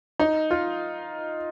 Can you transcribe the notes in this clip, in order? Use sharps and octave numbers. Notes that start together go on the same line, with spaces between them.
D#4
F4